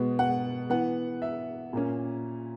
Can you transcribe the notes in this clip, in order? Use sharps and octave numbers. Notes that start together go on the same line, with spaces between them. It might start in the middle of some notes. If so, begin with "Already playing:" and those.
Already playing: B2 G#3 B3
F#5
E3 B3 F#5
E5
A#2 A#3 C#4